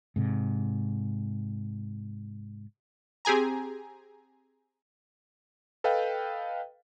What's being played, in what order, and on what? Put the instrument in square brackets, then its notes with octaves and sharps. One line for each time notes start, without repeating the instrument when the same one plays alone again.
[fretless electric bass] G#2 C3
[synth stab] C4 G4 G#4 G#5 A#5
[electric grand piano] A4 B4 D#5 F5 G5